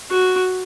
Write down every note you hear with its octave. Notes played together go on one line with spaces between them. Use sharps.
F#4